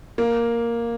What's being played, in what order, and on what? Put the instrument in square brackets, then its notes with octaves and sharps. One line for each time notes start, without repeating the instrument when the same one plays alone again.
[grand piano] A#3